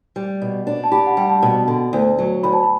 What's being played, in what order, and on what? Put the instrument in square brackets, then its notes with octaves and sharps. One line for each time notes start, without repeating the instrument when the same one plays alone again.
[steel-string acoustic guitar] G3
B2
D4
[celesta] A5
[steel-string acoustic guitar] G4 [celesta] B5
[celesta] F#5
[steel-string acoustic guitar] G3 [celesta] G5
[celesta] A5
[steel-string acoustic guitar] B2
D3
D2
F#3
[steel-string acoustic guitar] D2 [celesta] B5
[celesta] A5
B5